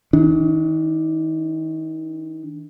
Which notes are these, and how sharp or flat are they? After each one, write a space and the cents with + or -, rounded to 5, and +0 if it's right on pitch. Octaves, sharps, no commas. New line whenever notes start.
D#3 +40 D4 +0